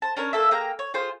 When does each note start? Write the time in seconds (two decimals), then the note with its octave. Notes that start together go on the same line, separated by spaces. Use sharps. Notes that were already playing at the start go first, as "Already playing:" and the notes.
0.02 C5 A5
0.17 C#4 D4 A#4 C#5
0.33 A#3 A4 E5
0.51 A#3 G#4 G5 A#5
0.79 C#5
0.94 F4 G#4 C5